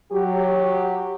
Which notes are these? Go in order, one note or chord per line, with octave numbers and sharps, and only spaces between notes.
F#3 G4